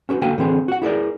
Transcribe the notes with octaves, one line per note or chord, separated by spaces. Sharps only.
C#4 F#4 G4 B4
D3 A#3 F#4 G5 G#5
D3 E3 C4 G#4
F#4 F#5
E4 G#4 A#4 D5